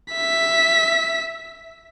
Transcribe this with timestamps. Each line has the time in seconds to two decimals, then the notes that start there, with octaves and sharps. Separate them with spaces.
0.13 E5 B6